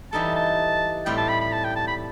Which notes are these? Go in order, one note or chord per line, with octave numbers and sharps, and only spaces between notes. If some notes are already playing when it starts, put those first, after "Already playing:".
E3 G3 D#4 A4 A5
A5
A2 G3 C4 G5
A5
B5
B5
A5
G5
A5
B5